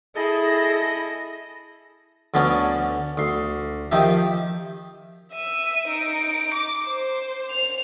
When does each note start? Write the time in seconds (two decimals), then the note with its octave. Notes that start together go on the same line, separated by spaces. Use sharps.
0.16 E4 G#4 A4 D#5 A#6
2.34 D2 D3 B3 C#4 D4
3.18 D2 C6
3.92 D#3 F3 D#4 G4 E5
5.33 E5 D#7
5.88 D#4 D7
6.54 D6
6.88 C5
7.51 F7